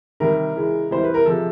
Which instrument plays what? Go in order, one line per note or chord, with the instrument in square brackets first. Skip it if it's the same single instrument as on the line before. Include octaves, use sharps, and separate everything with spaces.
[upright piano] C3 D#3 G3 A#4
C#3 E3 G#3
C3 E3 G3 C5
B4
A#4
C3 F3 G#3 A4